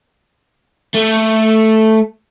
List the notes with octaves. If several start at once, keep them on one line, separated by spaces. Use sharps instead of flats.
A3